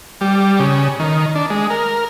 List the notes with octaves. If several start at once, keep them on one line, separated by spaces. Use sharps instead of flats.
G3
C#3
D#3
D4
G#3
A#4